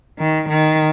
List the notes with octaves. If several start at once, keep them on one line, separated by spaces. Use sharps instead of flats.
D#3
D#3